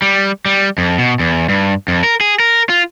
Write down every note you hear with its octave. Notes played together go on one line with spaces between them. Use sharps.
G3
G3
F2
B2
E2
G2
F2
A#4
G#4
A#4
F4